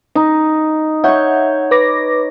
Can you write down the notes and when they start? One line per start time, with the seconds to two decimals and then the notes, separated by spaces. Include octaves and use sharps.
0.15 D#4
1.04 C#5 E5 F#5 C#6 G6
1.71 B4 D6 A#6